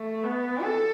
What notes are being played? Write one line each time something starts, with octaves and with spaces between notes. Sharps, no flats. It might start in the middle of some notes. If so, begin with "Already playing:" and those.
Already playing: A3
B3
A4